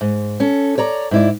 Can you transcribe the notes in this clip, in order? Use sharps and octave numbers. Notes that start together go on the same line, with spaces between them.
G#2
C#4 A4
C#5 D5 A#5
G#2 E4 D5